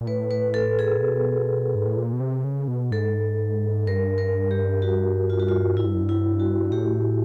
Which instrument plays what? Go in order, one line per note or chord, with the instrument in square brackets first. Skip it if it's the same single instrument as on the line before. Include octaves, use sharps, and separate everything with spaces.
[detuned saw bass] A#2
[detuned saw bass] A2 [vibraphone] B4
[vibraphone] B4
A4
G#4
[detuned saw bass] A#2
B2
G#2
A2
A#2
B2
C3
C#3
B2
[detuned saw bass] G#2 [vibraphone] A4
[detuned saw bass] G2 [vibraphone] A#4
[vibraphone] A#4
G4
F#4
F4
F#4
F4
[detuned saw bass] G#2 [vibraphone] E4
[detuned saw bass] G2
F#2
G2
[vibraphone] E4
F#4
[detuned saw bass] A2 [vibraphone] G4